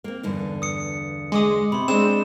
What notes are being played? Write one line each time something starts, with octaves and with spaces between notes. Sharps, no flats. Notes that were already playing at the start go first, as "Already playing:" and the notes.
A#3 C4
E2 G2 D3
D#6 C#7
G#3 C6 D6 D#6
C3 B5 C6
G#3 C4 D4 G#4 E7